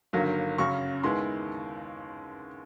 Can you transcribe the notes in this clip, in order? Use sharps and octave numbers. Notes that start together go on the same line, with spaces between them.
G1 G2 D#3 F#3 A#3
F#2 C#3 F#3 C#6
D#2 D#3 G#3 B3 E4 C6